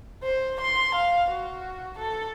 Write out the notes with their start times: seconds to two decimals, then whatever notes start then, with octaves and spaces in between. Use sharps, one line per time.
0.23 C5
0.61 C6
0.95 F5
1.30 F#4
1.99 A4